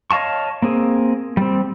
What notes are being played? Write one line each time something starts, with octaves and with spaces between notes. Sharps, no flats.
C#5 D#5 F5 A5 C#6
A#3 C4 G#4
G3 C4